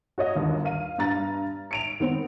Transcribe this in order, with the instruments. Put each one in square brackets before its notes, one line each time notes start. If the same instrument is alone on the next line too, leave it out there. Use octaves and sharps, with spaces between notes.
[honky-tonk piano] F#4 C#5 D#5
G1 D#2
F5 D#7
G2 A#5 A6
C#7 D7 F7
D#3 B3 C4